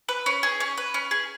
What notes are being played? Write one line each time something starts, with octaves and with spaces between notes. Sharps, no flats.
B4
C#4
G#4
C#4
B4
C#4
G#4